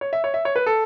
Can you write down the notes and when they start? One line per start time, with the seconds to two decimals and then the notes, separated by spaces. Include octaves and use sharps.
0.01 C#5
0.13 E5
0.24 C#5
0.34 E5
0.45 C#5
0.56 B4
0.66 A4